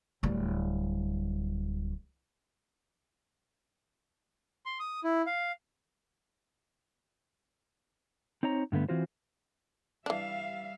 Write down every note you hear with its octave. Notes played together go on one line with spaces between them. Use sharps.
D1 G3
C6
D#6
E4
F5
C4 D#4 C#5 A#5
G2 D3 A3 B3
E3 C4 F4 F#4 C5
E3 G3 D4 E5 F5